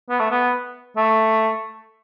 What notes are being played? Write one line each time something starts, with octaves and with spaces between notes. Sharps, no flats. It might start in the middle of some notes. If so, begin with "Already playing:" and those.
B3
A3
B3
A3